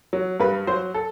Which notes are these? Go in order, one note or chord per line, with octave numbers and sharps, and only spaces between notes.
F#3
G2 B4
F#3 C5
A4